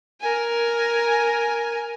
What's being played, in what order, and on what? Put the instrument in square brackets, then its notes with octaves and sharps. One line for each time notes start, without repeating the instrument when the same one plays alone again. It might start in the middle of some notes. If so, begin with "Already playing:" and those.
[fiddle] A#4 G#5